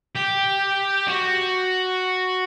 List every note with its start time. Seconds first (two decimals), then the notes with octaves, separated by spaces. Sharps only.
0.15 G4
1.08 F#4